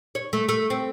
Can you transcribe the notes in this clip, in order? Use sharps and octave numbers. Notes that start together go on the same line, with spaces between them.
C#5
A3
A3
C4